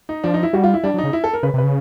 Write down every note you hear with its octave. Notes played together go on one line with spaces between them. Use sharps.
D#4
F3 D4
D#4
E4
G3 F#4
F4
E4
G3 D4
F#3
D#4
C#3
E4
A4
A#4
C#3 B4
C3
B4
C#3